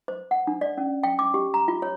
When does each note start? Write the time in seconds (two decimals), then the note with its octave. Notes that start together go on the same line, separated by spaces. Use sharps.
0.08 C5
0.31 F#5
0.47 D4
0.61 D5
0.78 C#4
1.03 G5
1.19 D6
1.34 G4
1.54 A#5
1.68 F4
1.82 C#5